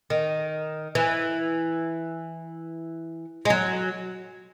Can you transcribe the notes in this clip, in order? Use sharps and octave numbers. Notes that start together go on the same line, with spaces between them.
D#3
E3
G#3
F#3